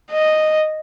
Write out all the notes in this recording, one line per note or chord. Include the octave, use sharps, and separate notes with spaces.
D#5